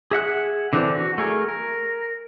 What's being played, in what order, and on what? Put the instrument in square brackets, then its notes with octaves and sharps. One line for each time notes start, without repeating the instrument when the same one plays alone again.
[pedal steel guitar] G#4 E5 F#5 F#6
D3 E3 C4 D4
F#4
A3 G#4 A#4
A#4